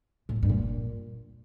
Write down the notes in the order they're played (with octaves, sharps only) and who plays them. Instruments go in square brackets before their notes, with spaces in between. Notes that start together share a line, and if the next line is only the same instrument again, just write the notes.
[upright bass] A2
E3
G2
A#2